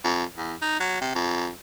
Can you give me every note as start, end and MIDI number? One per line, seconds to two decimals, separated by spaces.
0.04 0.24 41
0.37 0.55 40
0.62 0.75 63
0.80 0.97 54
1.01 1.12 48
1.15 1.49 41